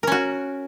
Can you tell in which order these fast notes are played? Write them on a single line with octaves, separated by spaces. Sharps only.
A#4 C#4 F#4